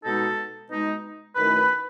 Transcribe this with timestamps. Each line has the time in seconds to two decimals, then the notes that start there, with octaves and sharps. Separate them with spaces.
0.04 B2 G#3 D#4 A4
0.70 B2 G#3 D#4
1.36 F#2 D#3 A3 C#4 E4 B4